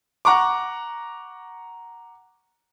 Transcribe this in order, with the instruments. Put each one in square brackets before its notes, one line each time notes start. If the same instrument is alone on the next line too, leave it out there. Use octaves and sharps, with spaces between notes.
[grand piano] F#5 A#5 C#6 D6